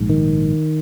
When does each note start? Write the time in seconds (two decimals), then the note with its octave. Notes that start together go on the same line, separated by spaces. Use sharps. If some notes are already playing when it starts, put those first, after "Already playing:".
Already playing: A#1 G#2
0.10 D#3